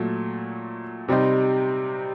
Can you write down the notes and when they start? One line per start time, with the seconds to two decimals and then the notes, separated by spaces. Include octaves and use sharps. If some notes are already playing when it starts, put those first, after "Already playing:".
Already playing: A#2 F#3 A3
1.08 C3 G3 C4 D#4